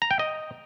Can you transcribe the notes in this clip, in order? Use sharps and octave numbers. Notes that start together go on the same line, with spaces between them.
A#5
G5
D#5